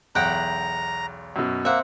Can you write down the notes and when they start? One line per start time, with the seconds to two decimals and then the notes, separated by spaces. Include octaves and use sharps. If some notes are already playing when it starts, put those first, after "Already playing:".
0.15 B1 E2 F#5 G5 A#5
1.36 F#2 B2
1.65 A#3 C4 E5 F#5